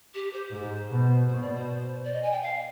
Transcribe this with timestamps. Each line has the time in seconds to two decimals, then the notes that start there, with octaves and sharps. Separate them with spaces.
0.14 G4
0.33 C5
0.51 G#2 C5
0.90 B2
1.28 B2 C5
1.41 D5
1.55 C5
2.04 D5
2.13 D#5
2.22 G#5
2.31 G5
2.42 F5